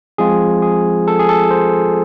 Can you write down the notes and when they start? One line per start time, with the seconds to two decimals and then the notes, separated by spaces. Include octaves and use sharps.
0.18 F3 G#3 C4 F4 G#4
0.62 G#4
1.08 A4
1.19 G#4
1.29 A4
1.51 C5